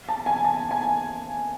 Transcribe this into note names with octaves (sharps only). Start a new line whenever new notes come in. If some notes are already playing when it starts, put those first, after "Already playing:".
A5
G#5
A5
G#5